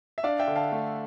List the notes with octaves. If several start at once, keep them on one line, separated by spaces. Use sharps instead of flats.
E5
D4 D5 F5
E5 G5
D3
F5 A5
A3